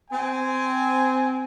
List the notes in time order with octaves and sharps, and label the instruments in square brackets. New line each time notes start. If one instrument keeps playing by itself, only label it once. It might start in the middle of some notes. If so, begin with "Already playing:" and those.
[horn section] C4 G#5